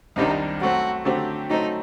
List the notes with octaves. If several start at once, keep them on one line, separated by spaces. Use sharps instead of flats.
C2 C3 D#3 G3 D4 D#4
F#3 A3 C4 F#4
D3 F#3 A3 C4 G4
F#3 A3 C4 D#4